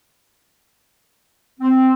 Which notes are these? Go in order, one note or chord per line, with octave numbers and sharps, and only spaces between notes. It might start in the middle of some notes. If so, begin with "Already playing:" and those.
C4